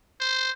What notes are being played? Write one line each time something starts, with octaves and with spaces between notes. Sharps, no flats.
C5